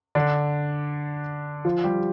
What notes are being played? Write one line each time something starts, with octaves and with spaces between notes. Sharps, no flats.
D3 D4
F3 F4
G3 G4